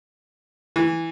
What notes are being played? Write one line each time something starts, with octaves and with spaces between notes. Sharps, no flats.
E3